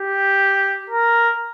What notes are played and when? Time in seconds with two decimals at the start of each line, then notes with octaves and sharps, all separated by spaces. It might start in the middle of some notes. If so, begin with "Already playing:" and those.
Already playing: G4
0.90 A#4